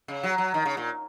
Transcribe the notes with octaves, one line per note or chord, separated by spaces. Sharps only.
C#3
F#3
F#3
D#3
C#3
A#2